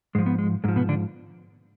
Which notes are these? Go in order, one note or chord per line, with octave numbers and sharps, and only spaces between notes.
G#2 F3 G#3
B3
G#3
G#2 F3 G#3
B2 B3
D3 D4